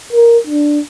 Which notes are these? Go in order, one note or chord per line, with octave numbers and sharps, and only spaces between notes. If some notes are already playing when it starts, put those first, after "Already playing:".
A#4
D4